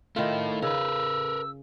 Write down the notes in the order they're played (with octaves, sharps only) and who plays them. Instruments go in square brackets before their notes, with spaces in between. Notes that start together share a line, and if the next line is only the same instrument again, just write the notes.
[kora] D#3 F4 [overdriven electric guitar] A3 E4
[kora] C#3 [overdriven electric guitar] A#4 B4 [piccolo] E6